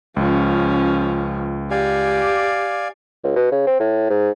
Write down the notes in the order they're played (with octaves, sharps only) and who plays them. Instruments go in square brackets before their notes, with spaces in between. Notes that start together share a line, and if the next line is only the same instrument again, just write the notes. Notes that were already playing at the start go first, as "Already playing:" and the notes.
[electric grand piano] C#2 [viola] F3 C#4
[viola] G4 [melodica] D5 F5 G#5
[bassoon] C#2
B2
C#3
C4
A2
G#2